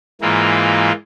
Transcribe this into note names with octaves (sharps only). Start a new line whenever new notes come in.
G#2 E3 A#3 F4